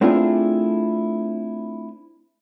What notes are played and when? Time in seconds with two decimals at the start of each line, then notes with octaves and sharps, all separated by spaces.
0.01 A3 C4 D4 E4 F4 G#4